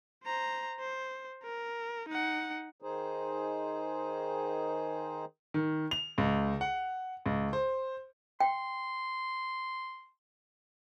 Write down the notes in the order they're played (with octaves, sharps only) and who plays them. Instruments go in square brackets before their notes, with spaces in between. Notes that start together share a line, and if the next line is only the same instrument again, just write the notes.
[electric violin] C5 A#5
C5
A#4
D#4 F#5
[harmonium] D#3 D#4 G#4 C5
[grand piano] D#3
F7
C#2
F#5
C#2
C5
[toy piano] G5 [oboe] C6